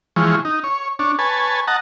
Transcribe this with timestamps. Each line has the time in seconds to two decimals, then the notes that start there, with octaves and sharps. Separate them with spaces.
0.16 E3 F3 G#3 C#5
0.45 D#4
0.64 C#5
0.99 D4 C#5
1.19 B4 C#5 G#5 A5
1.67 D#5 F#5 A5 A#5